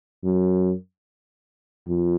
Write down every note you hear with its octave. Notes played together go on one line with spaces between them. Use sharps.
F#2
F2